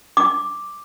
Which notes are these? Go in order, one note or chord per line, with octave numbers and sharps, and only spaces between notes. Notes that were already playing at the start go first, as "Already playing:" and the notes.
D6